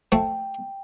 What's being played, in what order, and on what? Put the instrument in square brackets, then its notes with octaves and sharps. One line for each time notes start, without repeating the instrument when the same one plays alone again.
[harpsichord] F3 A3 [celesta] G5